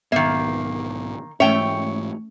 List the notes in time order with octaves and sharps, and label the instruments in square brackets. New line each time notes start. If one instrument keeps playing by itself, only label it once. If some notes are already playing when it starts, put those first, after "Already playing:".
[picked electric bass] B1 G#2 B3 [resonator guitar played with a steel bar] D#3 A#3 [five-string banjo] E5
[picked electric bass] G#2 E3 [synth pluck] A3 C#4 [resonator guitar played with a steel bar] C#5 G5 [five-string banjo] E5